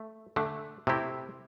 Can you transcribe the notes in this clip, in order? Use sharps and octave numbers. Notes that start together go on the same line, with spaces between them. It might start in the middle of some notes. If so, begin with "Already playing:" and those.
Already playing: A3
D3 A3 D4
C3 A3 C4 E4 G4